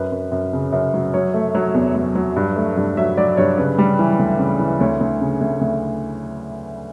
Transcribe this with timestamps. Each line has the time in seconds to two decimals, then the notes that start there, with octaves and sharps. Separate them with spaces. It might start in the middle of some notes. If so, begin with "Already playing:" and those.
Already playing: F#2 B4
0.12 F#2
0.32 F#2
0.53 C#3
0.72 F#2
0.94 F#3
1.14 F#3 C#5
1.34 A3
1.55 F#3
1.74 E2
1.95 F#3
2.15 F#3
2.36 G2
2.56 A3
2.77 G2
2.97 F#3 E5
3.17 F#3 D5
3.37 G2 C#5
3.58 C#3 B4
3.78 G3
3.99 E3
4.19 D2
4.39 C#3
4.59 E3
4.80 D2 C#5
5.01 D2
5.21 C#3
5.41 D2
5.61 D2